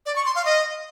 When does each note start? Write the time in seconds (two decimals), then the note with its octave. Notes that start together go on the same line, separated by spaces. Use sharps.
0.06 D5
0.16 C#6
0.25 C6
0.35 F5
0.45 D#5